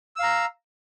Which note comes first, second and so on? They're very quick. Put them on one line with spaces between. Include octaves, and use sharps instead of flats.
E6 F5 A#5